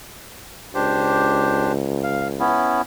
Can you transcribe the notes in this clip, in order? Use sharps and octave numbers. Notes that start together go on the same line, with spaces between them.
C#2 D4 G4 C5
F5
B3 C#4 E4